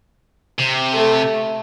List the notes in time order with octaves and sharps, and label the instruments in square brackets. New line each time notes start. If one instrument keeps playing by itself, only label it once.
[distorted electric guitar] C3
[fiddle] A3